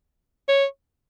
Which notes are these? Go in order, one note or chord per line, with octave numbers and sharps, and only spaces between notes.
C#5